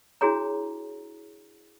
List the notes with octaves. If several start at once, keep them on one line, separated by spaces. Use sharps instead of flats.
D4 E4 F#4 G#4 C#5 A#5